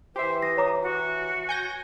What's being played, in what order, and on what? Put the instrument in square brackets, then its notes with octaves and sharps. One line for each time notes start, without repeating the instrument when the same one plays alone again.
[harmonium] E3 [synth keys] G4 E5 [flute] C5
[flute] D#6 [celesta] A#6
[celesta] C#5 A#5 D6
[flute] F#4
[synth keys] G#5 G6 A#6